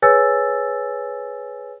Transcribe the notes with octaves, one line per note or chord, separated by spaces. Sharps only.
G#4 B4 C#5 G#5 E6 A6